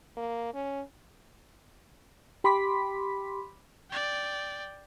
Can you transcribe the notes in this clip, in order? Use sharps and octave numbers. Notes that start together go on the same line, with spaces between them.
A#3
C#4
G4 B5 C6 D6 B6
D5 G5